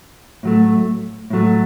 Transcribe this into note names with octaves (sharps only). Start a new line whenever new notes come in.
A2 F#3 A3
A2 F#3 A3